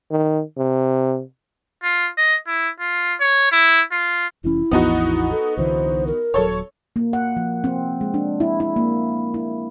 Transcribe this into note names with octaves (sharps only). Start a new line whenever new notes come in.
D#3
C3
F4
D#5
E4
F4
C#5
E4
F4
F1 E3 C#4 E4
A1 E2 F3 B3 D#4 F#4
A4
C2 D3 E3 C5
A#4
D#1 F#3 A4 C#5
A#3
F#5
F3
C4
G#3
D4
E4
E4
A#3
E4